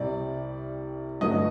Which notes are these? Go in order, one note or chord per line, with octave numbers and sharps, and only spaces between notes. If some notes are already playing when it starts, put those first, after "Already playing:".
Already playing: C2 C3 G3 D5
G1 G2 F#3 A3 D#5